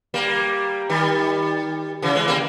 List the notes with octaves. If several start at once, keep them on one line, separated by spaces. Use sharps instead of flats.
G3 A#3
D#3 G3
C#3 E3
E3 G#3
G3 A#3